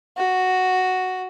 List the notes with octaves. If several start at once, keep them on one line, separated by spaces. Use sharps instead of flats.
F#4